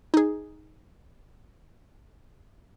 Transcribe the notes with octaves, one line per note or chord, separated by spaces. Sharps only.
D#4 G#4